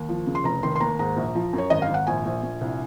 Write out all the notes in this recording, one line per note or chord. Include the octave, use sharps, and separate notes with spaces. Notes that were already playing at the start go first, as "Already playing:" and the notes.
Already playing: D#2
F3
C#3
C6
F1 A#5
D#3 C6
C6
D#2 A#5
G#2 A#5
A#1
F3
F#2
C#5
G#1 D#5
F5
G#1
F#5
A#1 G#5
A#1
A#1
C2